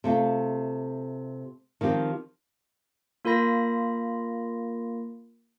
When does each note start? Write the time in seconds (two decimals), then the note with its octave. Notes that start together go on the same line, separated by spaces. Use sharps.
0.04 C3 A3 F4
1.81 D#3 F3 C4 G4
3.25 A#3 F4 A#4 B5 A#6